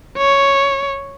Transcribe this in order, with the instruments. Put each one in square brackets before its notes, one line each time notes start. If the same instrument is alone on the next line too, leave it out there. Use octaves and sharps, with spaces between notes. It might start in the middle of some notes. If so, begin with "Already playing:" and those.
[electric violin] C#5